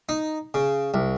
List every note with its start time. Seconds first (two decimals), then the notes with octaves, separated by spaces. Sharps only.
0.09 D#4
0.54 C#3
0.94 C2